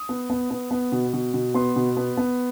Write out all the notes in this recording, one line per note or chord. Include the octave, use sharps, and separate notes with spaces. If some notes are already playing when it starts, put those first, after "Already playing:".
Already playing: D#6
B3
B3
B3
B3
B2
B2
B2
B3 C6
B2
B3
B3